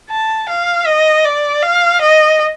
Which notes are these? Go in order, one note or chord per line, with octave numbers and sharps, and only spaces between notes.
A5
F5
D#5
D5
F5
D#5